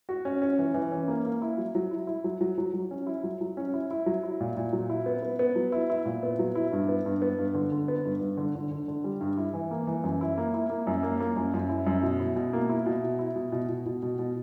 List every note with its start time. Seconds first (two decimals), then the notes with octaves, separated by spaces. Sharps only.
0.09 F#4
0.25 C#4
0.42 C#4
0.59 E3
0.74 E3
0.92 C#4
1.08 A#3
1.25 A#3
1.42 E4
1.58 F#3
1.75 F#3
1.91 E4
2.07 E4
2.24 F#3
2.41 F#3
2.58 F#3
2.74 F#3
2.91 C#4
3.07 E4
3.23 F#3
3.41 F#3
3.57 C#4
3.74 E4
3.91 E4
4.06 F#3
4.23 E4
4.40 A#2
4.57 A#2
4.73 F#3
4.90 E4
5.06 B3
5.23 B3
5.39 B3
5.55 F#3
5.72 E4
5.90 E4
6.06 A#2
6.23 B3
6.39 F#3
6.55 E4
6.72 G2
6.89 B3
7.06 G2
7.22 B3
7.39 G2
7.54 D3
7.72 D3
7.88 B3
8.05 G2
8.21 G2
8.37 D3
8.55 D3
8.71 D3
8.88 D3
9.04 G3
9.21 G2
9.37 E4
9.54 E3
9.71 A#3
9.87 E3
10.04 F#2
10.21 E4
10.38 A#3
10.54 E4
10.70 A#3
10.87 F#2
11.03 A#3
11.20 A#3
11.36 F#2
11.54 F#2
11.69 E4
11.87 F#2
12.03 B2
12.20 E4
12.36 B2
12.53 A#3
12.69 E4
12.86 B2
13.03 E4
13.19 E4
13.36 B2
13.52 B2
13.69 B2
13.86 B2
14.02 B2
14.19 B2